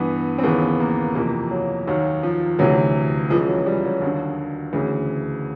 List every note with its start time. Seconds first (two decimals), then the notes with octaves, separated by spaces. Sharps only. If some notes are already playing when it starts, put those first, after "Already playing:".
Already playing: G2 E3 B3
0.38 C4
0.43 D#2 C#3 E3 B3
0.80 A#3
1.15 F2 C3 E3 A#3
1.51 F#3
1.87 D#2 D#3 F#3
2.23 F3
2.59 D2 C3 E3 F#3
3.30 C#2 C#3 E3 F3
3.48 F#3
3.66 G3
3.84 F#3
4.01 D#2 D3
4.73 D2 C#3 E3